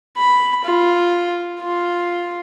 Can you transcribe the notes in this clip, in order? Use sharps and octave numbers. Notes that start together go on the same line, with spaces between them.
B5
F4
F4